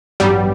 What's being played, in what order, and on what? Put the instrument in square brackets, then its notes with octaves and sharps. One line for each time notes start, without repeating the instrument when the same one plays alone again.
[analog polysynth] A1 G2 F#3 B3 [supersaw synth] G3